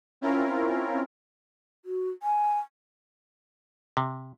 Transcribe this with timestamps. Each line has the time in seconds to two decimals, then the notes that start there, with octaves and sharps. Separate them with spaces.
0.21 C4 C#4 E4 F4 A#4
1.85 F#4
2.23 G#5
3.97 C3